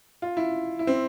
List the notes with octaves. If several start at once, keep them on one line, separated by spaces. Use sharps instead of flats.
F4
E4
E4
C4